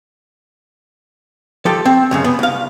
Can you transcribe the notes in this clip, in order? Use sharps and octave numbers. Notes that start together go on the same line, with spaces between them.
F3 F4 G4 A4
C4
C#2 F#2 C#3
B3
C2 F5